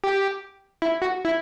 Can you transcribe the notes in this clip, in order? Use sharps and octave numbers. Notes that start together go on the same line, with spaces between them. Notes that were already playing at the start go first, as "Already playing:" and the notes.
G4
E4
F#4
E4